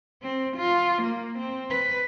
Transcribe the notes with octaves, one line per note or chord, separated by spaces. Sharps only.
C4
F4
A#3
C4
B4